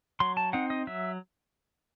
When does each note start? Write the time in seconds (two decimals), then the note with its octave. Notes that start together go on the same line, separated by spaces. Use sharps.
0.20 F#3 C6
0.37 A5
0.53 C4 D#4 F#5
0.70 D#5
0.87 F#3 E5